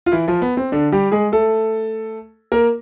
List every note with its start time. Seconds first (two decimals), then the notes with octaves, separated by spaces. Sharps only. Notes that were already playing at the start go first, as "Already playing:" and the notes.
0.06 F4
0.12 E3 E4
0.28 F3 F4
0.42 B3
0.57 C4
0.72 D3 D4
0.92 G3 G4
1.12 G#3 G#4
1.32 A3 A4
2.52 A#3 A#4